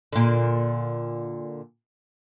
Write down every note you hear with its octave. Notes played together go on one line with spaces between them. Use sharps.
A#2 D3